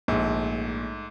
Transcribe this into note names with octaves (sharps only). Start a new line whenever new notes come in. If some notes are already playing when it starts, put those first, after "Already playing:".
A#1 G#2 A3